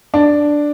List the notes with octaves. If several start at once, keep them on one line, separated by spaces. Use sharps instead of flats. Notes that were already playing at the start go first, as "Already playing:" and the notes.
D4